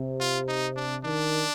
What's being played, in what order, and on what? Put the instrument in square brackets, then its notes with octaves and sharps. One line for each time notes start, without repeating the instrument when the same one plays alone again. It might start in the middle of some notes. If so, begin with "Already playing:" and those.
Already playing: [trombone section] C3
[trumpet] F4
D#4
D4
[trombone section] D#3 [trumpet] D4